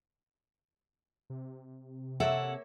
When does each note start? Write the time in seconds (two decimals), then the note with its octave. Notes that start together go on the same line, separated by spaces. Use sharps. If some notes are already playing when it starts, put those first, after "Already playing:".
1.30 C3
2.20 A#3 A4 C#5 E5 F#5